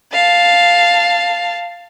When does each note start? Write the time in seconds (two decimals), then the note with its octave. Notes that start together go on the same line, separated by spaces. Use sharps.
0.13 F5 A5